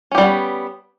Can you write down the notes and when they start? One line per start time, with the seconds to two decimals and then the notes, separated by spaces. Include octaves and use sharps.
0.11 C#4
0.15 G4
0.18 G3
0.21 B3